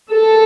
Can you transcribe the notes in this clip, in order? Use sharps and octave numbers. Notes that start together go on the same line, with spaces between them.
A4